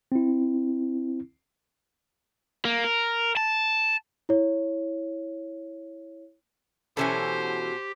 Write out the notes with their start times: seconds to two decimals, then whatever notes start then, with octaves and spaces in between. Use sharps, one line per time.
0.12 C4 E4
2.65 A#3
2.84 A#4
3.37 A5
4.29 E4 C#5
6.97 B2 E3 F#3 C#4 G4 A4 C5 G#5